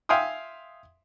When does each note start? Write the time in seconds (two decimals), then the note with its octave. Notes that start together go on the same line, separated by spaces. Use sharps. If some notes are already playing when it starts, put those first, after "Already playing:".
0.09 E5 F5 G5 G#5 C6 D#6